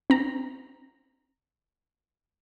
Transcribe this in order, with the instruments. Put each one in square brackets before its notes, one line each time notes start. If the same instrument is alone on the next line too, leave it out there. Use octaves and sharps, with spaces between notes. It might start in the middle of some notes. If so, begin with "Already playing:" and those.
[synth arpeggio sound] C4 A#5